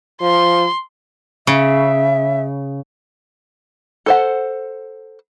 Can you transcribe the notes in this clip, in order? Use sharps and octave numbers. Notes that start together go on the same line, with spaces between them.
F3 C6
C#3 E5
A4 C5 F#5